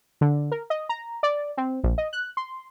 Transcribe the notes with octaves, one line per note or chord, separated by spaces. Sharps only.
D3
A#4
D#5
A#5
D5
C4
A#1
D#5
F#6
C6